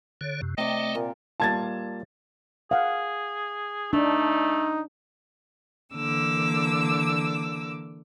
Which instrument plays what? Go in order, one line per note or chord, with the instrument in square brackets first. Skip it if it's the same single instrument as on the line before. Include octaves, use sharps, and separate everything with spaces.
[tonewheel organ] D3 C#5
F#2 C3
[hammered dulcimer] C3 D5 [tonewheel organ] A3 G5 [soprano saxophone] D#5
[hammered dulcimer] A#2
[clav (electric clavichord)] G3 A#3 F4 [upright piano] A5 G#6 A6
[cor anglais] G#4 [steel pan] F5 F#5
[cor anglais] A3 [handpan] D4 [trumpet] D#4
[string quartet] D3 E3 A#3 D6 E6